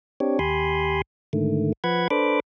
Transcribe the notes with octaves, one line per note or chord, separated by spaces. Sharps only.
C4 D4 G4 C#5
D#2 G4 G#5 B5 C6
G#2 D3 D#3 A3
F3 B4 F#5 B5 G#6
D4 A4 B4 C5 B5 D6